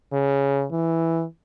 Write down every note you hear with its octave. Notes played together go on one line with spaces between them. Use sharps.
C#3
E3